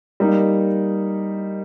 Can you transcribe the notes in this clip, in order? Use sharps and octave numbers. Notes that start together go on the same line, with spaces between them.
G3 A#3 D#4